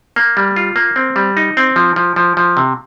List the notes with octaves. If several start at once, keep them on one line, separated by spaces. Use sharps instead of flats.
A#3
G3
F4
A#3
C4
G3
D#4
C4
F3
F3
F3
F3
C3